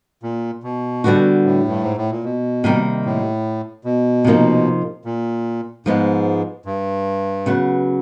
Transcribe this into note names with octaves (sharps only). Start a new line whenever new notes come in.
A#2
B2
D3 G3 B3 D4 F#4
A2
G2
G#2
A2
A#2
B2
C3 D#3 G3 A#3 D#4
A2
B2
C3 F3 A#3 D#4
A#2
G#2 F3 G#3 B3
G2
C#3 F#3 B3